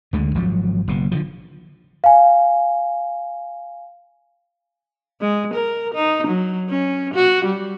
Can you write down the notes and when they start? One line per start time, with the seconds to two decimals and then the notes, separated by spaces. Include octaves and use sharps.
0.13 D2 D3 G#3
0.35 G#1 F3 F#3
0.88 F#1 B2
1.12 D3 D#3 F3
2.04 F5 G#5
5.21 G#3
5.54 A#4
5.94 D#4
6.27 F#3
6.69 C#4
7.14 F#4
7.45 G3